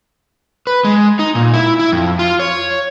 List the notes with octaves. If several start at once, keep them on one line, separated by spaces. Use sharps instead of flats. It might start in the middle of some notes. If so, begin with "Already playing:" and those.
B4
G#3
D#4
A#2
E4
E4
F2
F4
C#5